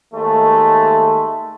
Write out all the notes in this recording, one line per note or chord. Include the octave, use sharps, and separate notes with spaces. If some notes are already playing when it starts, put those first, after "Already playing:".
D#2 G#3 A3